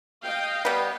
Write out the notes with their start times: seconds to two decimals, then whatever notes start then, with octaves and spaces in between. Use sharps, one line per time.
0.24 D#5 F5 G5
0.65 G3 B3